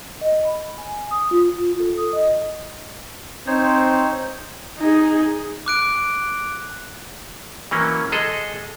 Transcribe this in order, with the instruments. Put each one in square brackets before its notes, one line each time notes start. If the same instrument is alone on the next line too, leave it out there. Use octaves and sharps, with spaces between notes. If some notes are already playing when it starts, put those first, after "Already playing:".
[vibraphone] D#5
B5
G#5
D#6
F4
A4
D#6
D#5
[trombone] C4 [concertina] D#4 C5 C#5
[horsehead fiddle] D#4 G#4
[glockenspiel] D6 F#6 D7
[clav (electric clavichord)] E3 F#3 A#3 C#4
G#3 G#4 A4 D#5